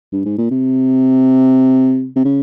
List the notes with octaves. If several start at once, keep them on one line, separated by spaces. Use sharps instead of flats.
G2
G#2
A#2
C3
C3
C#3